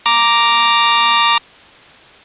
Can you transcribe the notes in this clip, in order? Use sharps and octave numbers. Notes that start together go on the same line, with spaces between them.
A#5 D6